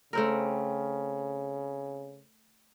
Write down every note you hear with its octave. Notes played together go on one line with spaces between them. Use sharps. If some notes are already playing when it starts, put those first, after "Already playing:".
C#3 A3 C4 A#4